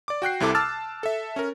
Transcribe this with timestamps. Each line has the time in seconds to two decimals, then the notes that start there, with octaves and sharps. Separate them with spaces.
0.08 D5 D6
0.22 F#4 G5 F#6 C7
0.40 C2 C3 E4 A4 D6
0.55 A5 D6 E6 F6 A6
1.03 A4 E5
1.36 C#4 A#4